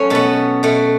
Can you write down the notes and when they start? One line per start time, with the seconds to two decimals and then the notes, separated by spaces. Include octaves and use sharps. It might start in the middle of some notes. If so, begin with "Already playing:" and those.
Already playing: F#3 A3 C#4 C#5
0.10 B2 B3 A4
0.63 B2 A3